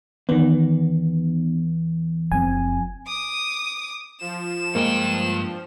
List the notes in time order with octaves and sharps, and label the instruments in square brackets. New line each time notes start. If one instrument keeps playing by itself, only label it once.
[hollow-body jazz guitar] E2 [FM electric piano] D#3 B3
[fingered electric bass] F#1 F3 C4 [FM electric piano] G#5
[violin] D6 D#6
[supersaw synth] F3 [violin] E7
[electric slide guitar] G2 G5 [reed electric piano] G#3 A#3